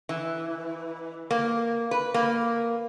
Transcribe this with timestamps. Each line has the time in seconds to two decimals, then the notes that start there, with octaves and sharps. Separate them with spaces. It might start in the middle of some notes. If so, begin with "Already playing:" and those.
0.09 E3
1.31 A#3
1.91 B4
2.14 A#3